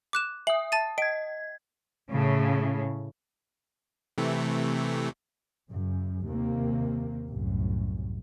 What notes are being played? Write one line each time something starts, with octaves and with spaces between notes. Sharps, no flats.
D6 F#6 E7
E5 D#6 F#7
A5 A6 D#7
D#5 G#6 D7
A2 C#3
C3 E3 A3
F#2 C#3
D#2 C3 A#3
C2 F#2 A2